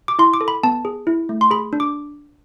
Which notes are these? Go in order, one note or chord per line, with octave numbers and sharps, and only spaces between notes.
D6
E4 C6
D6
A4
B5
B3 A5
G#4
E4
A3
C6
G#4 B5
D4
D6